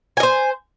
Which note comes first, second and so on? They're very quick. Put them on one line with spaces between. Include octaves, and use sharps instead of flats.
G#5 D#5 C5